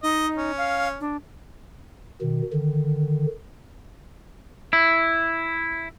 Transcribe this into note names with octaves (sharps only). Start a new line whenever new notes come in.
D#4 D#5
C#4
F5
D4
B2 D#3
D3 D#3
E4